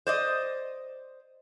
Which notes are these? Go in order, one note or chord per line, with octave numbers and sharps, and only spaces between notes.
C5 D5 D#5